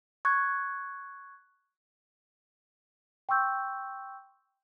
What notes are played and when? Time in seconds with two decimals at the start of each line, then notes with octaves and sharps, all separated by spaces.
0.25 C#6 F#6 G#6
3.29 G5 C6 C#6 E6 G6